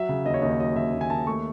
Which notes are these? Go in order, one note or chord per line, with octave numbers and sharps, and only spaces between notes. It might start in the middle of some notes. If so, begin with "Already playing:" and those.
Already playing: F#3 E5
C#3
D#2 D#5
C#5
D#2 D#5
C#5
F#3 D#5
C#3 E5
D#2
G#5
D#2 A5
A3 C#6